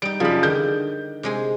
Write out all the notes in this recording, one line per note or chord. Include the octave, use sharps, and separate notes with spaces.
G3 D#4 D7
F#2 C#3 F3 B5
D3 D#3 G6
C3 G#3 G#5